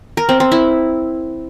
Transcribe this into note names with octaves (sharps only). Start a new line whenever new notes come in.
A#4
C4
C4
E4